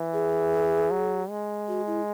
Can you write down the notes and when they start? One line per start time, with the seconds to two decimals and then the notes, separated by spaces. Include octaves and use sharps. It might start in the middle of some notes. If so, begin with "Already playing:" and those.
Already playing: E3
0.13 G#4
0.91 F#3
1.30 G#3
1.68 F#4
1.87 E4